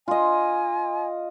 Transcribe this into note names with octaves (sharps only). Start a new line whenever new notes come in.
F4 D#5 G#5